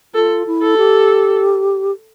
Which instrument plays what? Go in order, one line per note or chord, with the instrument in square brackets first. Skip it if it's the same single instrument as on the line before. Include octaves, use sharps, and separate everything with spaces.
[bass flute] F4 [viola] A4
[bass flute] E4
[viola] A4
[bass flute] G4